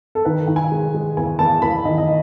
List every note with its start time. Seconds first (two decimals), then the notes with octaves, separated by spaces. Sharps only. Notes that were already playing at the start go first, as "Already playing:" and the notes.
0.15 A4
0.25 D#3 B4
0.48 D#3
0.56 G#5
0.72 G#3
0.94 G#3
1.17 E2 G#5
1.39 E2 A5
1.62 E2 B5
1.85 D#3 D#5
1.98 D#5